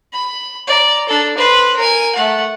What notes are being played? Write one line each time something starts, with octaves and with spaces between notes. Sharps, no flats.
B5
D5 A#5
D4 A4
B4 C5
A#4 G#5
A3 F#5